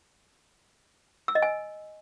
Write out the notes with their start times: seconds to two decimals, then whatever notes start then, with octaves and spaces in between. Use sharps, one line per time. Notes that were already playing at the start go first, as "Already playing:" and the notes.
1.28 E6
1.35 D#5
1.42 G#5